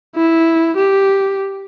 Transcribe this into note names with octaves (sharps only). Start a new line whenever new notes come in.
E4
G4